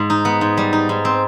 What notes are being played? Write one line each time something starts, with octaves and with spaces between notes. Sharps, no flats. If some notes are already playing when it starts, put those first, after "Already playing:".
Already playing: G#2
D#4
B3
G#2
G3
D#4
G#2
C4